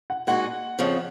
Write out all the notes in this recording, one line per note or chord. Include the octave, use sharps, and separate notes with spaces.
F#5
A#2 G#3 D#4 F#4 F#5
F2 C#3 F3